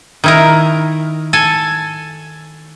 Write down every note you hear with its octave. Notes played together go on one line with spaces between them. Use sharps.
D#3 E4 A#4
A4 G#5 A5